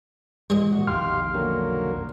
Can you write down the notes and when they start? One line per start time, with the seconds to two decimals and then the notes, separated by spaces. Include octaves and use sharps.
0.50 G#2 E3 G#3 G#4 D#5
0.72 A#2 E3 F#4
0.87 B1 F2 D#3 G4 F5 C6 F6
1.34 D3 F#3 A#3